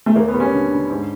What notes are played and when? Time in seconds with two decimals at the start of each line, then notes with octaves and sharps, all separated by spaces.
0.06 A3
0.16 D#2 A#3
0.28 B3
0.34 G3
0.40 C#4
0.53 D3
0.71 D3
0.90 G#2